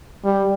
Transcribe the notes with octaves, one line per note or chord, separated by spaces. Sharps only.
G3